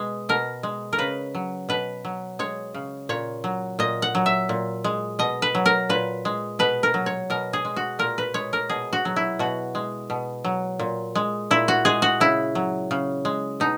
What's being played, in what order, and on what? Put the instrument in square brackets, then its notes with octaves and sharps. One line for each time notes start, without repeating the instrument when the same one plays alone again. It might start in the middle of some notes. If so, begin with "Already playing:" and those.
Already playing: [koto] B2 G#3 B4
B2 A#4
G#3
A#4
C#3 B4
F#3
B2 B4
F#3
G#3 C#5
C#3
A#2 C#5
F#3
A#2 D#5
F#5
F#3
E5
A#2
G#3
B2 D#5
B4
F#3
A#4
A#2 B4
G#3
B2 B4
A#4
F#3
C#5
B2 A#4
G#4
G#3
F#4
A#2 A#4
B4
G#3 C#5
A#4
B2 G#4
F#4
F#3
E4
B2 F#4
G#3
B2
F#3
A#2
G#3
A#2 E4
F#4
G#3 G#4
F#4
C#3 E4
F#3
C#3
G#3
B2 D#4